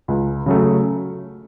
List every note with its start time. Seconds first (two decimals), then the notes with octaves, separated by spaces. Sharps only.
0.08 C#2
0.46 C#3 F#3 A3